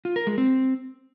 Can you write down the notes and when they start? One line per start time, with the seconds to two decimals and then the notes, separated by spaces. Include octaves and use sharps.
0.05 F4
0.16 A#4
0.27 G#3
0.38 C4